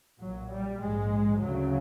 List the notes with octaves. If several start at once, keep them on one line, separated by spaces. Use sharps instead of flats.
B1 A#2 F#3
G3
A#1 G#2 G#3
D2 C#3 F#3